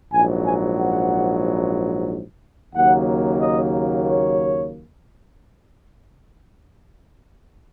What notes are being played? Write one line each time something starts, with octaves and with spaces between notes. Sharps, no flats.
A#1 G#2 F#3 G#5
G#5
F#5
D#2 C#3 F#3 A#3 F#5
D#5
C#5